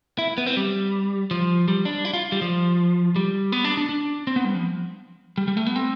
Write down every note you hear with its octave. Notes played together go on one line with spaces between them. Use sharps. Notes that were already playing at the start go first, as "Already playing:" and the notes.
E4
B3
C4
G3
F3
G3
D4
E4
F4
G3
F3
G3
B3
D4
D4
D4
C4
B3
G3
F3
G3
G3
A3
B3
C4